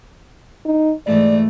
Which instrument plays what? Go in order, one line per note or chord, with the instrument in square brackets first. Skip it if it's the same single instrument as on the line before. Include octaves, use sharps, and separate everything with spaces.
[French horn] D#4
[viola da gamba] G#2 E3 A3 [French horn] D5